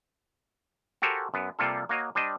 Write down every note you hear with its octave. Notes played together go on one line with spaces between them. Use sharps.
F#4 G4 A4 A#4 C5 G#5
F#2 B3
C3 G3 A#3 F4 A4
A#3 F#4 C#5 D#5
G3 D4 C5 D#5